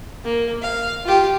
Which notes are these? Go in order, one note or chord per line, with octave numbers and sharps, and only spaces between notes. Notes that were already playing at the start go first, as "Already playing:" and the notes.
A#3
F5
F4 G4